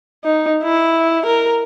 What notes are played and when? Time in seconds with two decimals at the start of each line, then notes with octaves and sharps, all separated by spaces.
0.24 D#4
0.63 E4
1.26 A#4